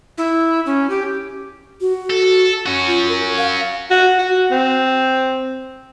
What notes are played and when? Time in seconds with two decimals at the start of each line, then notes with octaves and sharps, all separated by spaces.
0.18 E4
0.66 C#4
0.90 G4
1.81 F#4
2.10 A4
2.66 C#4 F#4
2.87 F4
3.09 A#4
3.38 F5
3.91 F#4
4.19 F#4
4.51 C4